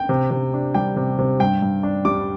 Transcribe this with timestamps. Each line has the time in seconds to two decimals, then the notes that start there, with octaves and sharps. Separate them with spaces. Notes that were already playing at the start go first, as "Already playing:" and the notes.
Already playing: G5
0.09 C3
0.31 C3
0.54 D4
0.75 G3 G5
0.96 C3
1.18 C3
1.40 G2 G5
1.62 G2
1.83 D4
2.05 G3 D6